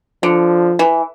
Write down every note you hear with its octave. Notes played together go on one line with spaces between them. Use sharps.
D3 F3
E3